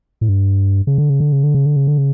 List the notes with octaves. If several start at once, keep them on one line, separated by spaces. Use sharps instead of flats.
A2
G2
C#3
D3
C#3
D3
C#3
D3
C#3
D3
C#3
D3
C#3